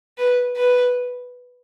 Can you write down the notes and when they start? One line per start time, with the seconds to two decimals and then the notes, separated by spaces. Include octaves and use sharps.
0.18 B4
0.57 B4